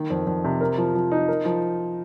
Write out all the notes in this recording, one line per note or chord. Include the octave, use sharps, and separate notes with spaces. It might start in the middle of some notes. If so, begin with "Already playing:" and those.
Already playing: D#3 A#3
F2
F2
C3
A#4
F3
F3
D#4
A#4
F3